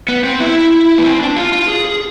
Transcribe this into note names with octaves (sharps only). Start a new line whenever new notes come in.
B3
C4
E4
B3
C4
D4
F4
F4
G#4
G#4